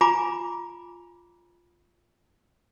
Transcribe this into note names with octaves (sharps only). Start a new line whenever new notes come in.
F4 G#5 A#5 B5 D6